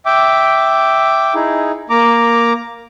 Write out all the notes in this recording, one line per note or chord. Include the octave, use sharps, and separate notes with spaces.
E5 G5 D6
D#4 E4 G#4
A#3 A#5 D6